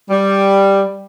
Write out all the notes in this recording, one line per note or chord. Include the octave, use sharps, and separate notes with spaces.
G3